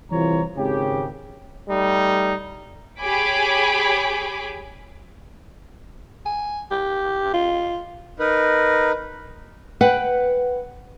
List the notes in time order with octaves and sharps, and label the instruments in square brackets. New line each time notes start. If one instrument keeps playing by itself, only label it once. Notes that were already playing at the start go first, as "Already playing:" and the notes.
[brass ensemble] C2 E3 F4 C5 C#5 A#5
G#1 C#3 G4
[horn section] G3 A3 D#4
[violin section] G4 G#4 C#5 G#5 B5 D6
[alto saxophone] G#5
G4
F4
[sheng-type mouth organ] D#4 A#4 B4
[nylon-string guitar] B4 F#5 G5